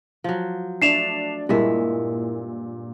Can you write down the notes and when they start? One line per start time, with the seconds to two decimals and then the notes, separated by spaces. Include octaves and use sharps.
0.24 F3 F#3
0.82 A3 D4 C7 E7 F7
1.49 G2 A#2 G#3 E4 A#4 E5